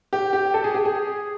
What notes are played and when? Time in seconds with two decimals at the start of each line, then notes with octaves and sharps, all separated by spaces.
0.13 G4
0.33 G4
0.54 A4
0.64 G#4
0.74 G4
0.85 G#4